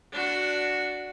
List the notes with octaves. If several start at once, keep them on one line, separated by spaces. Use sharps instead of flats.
D4 F#4